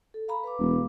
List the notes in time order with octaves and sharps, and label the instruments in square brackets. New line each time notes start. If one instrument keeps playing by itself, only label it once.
[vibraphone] A4
F5 A#5 B5
B4 F5 D6
[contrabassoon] E1